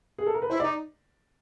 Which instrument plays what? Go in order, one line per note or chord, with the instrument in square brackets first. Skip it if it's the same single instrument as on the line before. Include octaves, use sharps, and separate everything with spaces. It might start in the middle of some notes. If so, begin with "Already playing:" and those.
[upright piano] G#4
A4
A#4
B4
[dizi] E4 [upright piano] C5
[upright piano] D5
[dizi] D#4